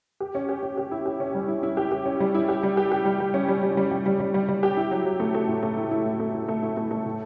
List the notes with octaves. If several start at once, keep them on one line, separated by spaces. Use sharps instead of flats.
G4
C#4
G4
C#4
G4
E4
G4
C#4
G3
E4
E4
G4
G4
C#4
G3
E4
G4
G3
G4
G4
G3
G3
C#4
G3
G3
G3
G3
G3
G3
G3
G3
G4
E4
F#3
F#3
A3
A3
A2
A3
E4
E4
A2
A3
E4
A3
E4
A3
A3
A2